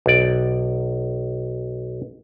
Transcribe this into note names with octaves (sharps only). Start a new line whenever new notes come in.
B1 D5